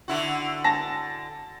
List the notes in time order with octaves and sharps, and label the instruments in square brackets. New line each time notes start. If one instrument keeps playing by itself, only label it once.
[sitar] D3 E4 F#4
[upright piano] A5 A#6